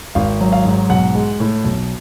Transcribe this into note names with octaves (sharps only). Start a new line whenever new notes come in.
G#1 F5
F#3
F5
G#2
B1 F#5
G#3
A2
B1